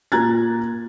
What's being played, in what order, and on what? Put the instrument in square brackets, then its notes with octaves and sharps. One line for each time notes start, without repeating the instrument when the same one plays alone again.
[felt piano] A#2 A#5 F#6 G#6 A6